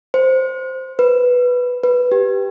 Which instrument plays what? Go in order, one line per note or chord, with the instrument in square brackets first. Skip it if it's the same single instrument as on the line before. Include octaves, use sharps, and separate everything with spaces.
[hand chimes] C5
B4
B4
G4